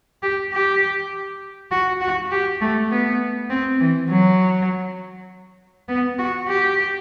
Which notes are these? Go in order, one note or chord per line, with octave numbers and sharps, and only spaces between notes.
G4
G4
F#4
F#4
G4
A3
B3
C4
E3
F#3
B3
F#4
G4